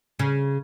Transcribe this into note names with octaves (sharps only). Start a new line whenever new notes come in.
C#3